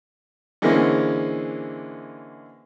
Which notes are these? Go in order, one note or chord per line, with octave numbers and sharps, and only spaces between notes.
D3 E3 G#3 A#3 C4 C#4